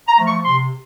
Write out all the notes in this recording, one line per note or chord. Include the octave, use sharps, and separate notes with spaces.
A#5
F3 A3
C#6
C3 C6